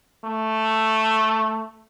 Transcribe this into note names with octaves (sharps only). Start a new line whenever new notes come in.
A3